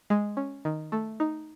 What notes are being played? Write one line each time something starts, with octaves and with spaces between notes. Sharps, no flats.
G#3
C#4
D#3
A3
D#4